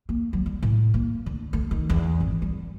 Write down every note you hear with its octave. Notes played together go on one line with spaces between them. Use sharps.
A#3
F#3
G3
A2
A#3
D2
A3
D#3
E2
G#1
G3